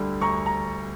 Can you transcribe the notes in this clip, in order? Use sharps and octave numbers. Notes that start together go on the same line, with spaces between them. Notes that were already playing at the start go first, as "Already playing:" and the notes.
Already playing: D2 D3 G3
D2 A#5 C#6
A#5